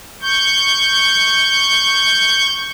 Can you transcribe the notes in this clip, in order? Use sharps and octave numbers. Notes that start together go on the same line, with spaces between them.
C#6 G6